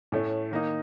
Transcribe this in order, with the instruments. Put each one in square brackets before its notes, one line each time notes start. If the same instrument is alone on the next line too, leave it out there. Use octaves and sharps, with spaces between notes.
[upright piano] A2 A3 C#4
D#3 A#3 D#4